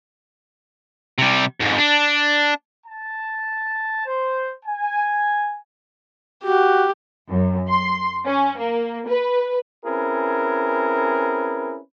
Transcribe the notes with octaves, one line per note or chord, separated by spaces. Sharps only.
C3 G3
F2 G#2
D4
A5
C5
G#5
F#4 G4
F#2
C6
C#4
A#3
B4
C4 C#4 E4 G#4 A#4 B4